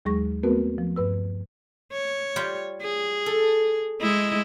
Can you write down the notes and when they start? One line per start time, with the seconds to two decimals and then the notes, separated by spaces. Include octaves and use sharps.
0.05 D#2 F#3 G#3 G#4 C#6 A#6
0.43 A3 B3 C4 F#4 A#4 B4
0.78 F3
0.96 G2 B4 E6
1.93 C#5
2.36 G3 F4 G5
2.82 G#4
3.26 A4
4.01 G#3 E4 D#5